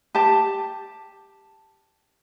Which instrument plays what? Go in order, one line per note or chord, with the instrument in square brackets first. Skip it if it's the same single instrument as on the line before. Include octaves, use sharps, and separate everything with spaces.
[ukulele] G4 A5